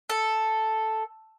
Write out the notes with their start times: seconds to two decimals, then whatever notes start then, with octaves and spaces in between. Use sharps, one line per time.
0.10 A4